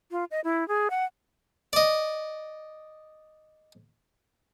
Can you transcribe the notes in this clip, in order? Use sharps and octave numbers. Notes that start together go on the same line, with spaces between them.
F4
D#5
E4
G#4
F#5
D5 D#5